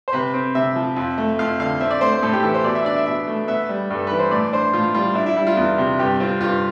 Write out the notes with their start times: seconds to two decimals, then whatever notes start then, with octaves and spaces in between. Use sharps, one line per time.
0.08 C5
0.13 C3 B4
0.34 C4
0.55 C3 E5
0.76 F3
0.97 F2
1.18 A3
1.39 F2 F5
1.60 D3 F5
1.80 C4 E5
1.91 D5
2.01 A3 C5
2.13 C5
2.22 A2 A4
2.33 G4
2.43 E3 A4
2.54 C5
2.64 B2 D5
2.75 E5
2.85 D4 D5
2.96 E5
3.06 B2 E5
3.27 A3
3.48 B3 E5
3.69 G3
3.90 G2 A4
4.07 E3 B4
4.19 C5
4.31 A2 D5
4.53 D4 C5
4.73 A2 F4
4.95 G3 F4
5.15 D4 E4
5.26 E4
5.37 G3 E4
5.47 F4
5.57 E2 F4
5.78 C3
5.99 G2 G4
6.20 C4 F4
6.41 G2 F4